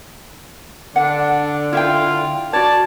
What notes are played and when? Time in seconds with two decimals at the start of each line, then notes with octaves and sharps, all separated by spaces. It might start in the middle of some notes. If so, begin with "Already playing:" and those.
0.96 D3 D4 F#5
1.73 E4 F4 E5 G5
2.53 F#4 C#5 D5 A5